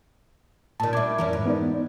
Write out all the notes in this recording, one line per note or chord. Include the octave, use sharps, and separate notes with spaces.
A#2 D#3 A5
G3 D4 E5 D6 G#6
F2 E3 C#4 E4 A#4
G#2
B3 D#4 D5